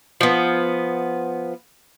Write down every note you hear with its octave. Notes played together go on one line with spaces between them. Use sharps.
F3 B3